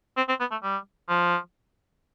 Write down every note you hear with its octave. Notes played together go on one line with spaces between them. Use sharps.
C4
C4
B3
A3
G3
F3